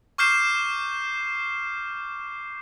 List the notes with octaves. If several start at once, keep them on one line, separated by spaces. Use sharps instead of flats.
C#6 D6 F6 G6 C7 E7